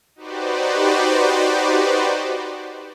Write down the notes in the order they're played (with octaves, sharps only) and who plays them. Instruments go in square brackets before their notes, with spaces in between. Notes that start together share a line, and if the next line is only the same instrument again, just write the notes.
[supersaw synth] D#4 F#4 G4 B4 C5 D5